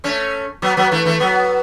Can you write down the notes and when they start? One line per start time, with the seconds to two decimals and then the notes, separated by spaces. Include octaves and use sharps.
0.04 A3 C#4
0.62 F#3 B3
0.77 F#3 B3
0.92 E3 A3
1.05 E3 A3
1.20 F#3 B3